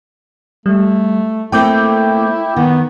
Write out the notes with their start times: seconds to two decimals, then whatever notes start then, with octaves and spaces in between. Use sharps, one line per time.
0.66 G3 A3
1.52 A3 A#3 C4 E4 G5 D6 G6
2.56 D#3 B3